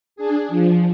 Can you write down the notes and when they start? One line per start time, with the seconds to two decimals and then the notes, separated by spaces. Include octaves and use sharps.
0.16 D4 G#4
0.48 F3